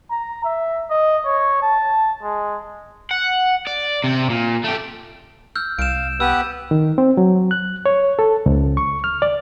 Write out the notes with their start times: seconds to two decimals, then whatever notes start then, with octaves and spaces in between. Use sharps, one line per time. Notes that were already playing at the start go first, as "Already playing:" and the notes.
0.11 A#5
0.45 E5
0.90 D#5
1.25 C#5
1.62 A5
2.23 G#3
3.11 F#5
3.67 D5
4.04 C3
4.30 A#2
4.64 A3 G4
5.55 E6 F6 G6
5.79 C2 F5 D7 E7
6.20 B3 G4 B4 E6
6.71 D#3
6.98 C4
7.17 F#3
7.51 F#6
7.86 C#5
8.19 A4
8.46 C#2
8.77 C#6
9.04 F6
9.22 D5